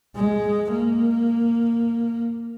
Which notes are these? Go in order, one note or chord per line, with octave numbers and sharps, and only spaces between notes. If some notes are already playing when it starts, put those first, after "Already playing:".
G#3
A#3